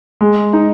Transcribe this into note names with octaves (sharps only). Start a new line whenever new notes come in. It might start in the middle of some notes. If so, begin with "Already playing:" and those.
G#3
D#4